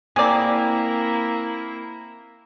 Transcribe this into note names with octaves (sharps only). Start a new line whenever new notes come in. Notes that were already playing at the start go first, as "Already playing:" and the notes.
A#3 C4 E4 G#4 D5